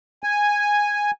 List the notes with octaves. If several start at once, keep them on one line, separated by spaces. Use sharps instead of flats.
G#5